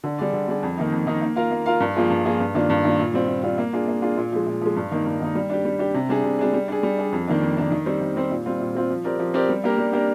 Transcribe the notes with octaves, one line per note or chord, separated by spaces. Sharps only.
D3
G3 D4 G#4 D5
D3
G3 D4 G#4 D5
F2
D#3 A#3 D#4
F2
D#3 A#3 D#4
A#3
F4 A#4 F5
A#3
F4 A#4 F5
G2
F3 A#3 F4 G#4
G2
F3 A#3 F4 G#4
G2
D#3 A#3 D4 F4
G2
D#3 A#3 D4 F4
A#2
G3 C4 F4
A#2
G3 C4 F4
A#3
D4 F4 G#4
A#3
D4 F4 G#4
A#2
F3 G#3
A#2
F3 G#3
G2
D#3 A#3 D#4
G2
D#3 A#3 D#4
G3
D4 G4
G3
D4 G4
C3
G3 D4 G#4
C3
G3 D4 G#4
G3
D4 G#4
G3
D4 G#4
F2
D#3 A#3 D4
F2
D#3 A#3 D4
D#3
G3 C4 G4 C5
D#3
G3 C4 G4 C5
A#2
G3 C4 F4
A#2
G3 C4 F4
F3
C4 G4 A#4 D5
F3
C4 G4 A#4 D5
G3
A#3 D4 G4 A#4
G3
A#3 D4 G4 A#4